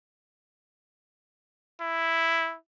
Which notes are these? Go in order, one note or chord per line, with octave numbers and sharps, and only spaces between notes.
E4